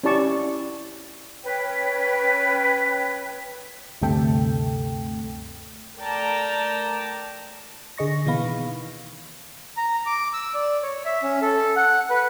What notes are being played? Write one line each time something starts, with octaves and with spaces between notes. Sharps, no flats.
C#4 E4 G4 D5 A5 C#6
C#4 B4 C#5 G5
D2 G2 C3 A3 A4 G5
A3 A#4 D5 G5 A5 A#5
D3 G#4 D#5 C#6 A#6
B2 E3 A#3 B3 F5 B5
D#3
A#5
D6
E6
D5
C#5
E5
C#4
A4
F#5
B4